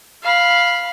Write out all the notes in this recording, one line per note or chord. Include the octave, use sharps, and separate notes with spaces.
F5 B5